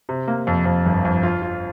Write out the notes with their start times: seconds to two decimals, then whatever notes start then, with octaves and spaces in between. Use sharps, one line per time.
0.09 C3
0.28 A#3
0.47 F2
0.65 F2
0.86 G1
1.05 F2
1.23 F4
1.42 F4